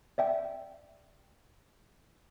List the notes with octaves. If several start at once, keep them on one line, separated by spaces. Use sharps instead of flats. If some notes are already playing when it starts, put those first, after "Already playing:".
D5 E5 G5